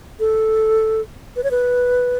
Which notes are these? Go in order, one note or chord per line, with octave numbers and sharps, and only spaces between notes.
A4
B4
C#5
B4